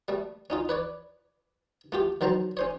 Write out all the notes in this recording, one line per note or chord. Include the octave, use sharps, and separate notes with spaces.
G3 A3
C#4 D#4 F4
B4 C#5 D5
A3 F4 G4
D#3 F#3 C5 A5 A#5
C#4 C5 C#5